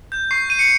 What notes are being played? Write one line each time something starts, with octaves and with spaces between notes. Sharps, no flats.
G6
C#6 C7
G6 D#7
C#7